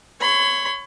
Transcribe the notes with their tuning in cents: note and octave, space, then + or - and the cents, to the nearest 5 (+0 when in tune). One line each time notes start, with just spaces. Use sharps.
C#5 +0 B5 +40